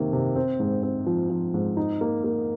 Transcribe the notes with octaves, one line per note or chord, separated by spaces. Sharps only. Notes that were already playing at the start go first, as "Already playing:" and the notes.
Already playing: C3 D#3 A#3
C3
C4
G#2
C4
F3
F3
G#2
D#4
A#3
A#3